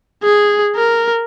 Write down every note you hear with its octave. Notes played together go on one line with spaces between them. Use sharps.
G#4
A#4